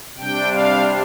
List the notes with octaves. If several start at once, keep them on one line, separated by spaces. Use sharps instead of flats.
C3 G3 D4 G5
F5